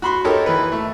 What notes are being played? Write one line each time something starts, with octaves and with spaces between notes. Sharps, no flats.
F#4 B5 C6
D#4 G4 A4 A#4 C#5
E3 B4
A3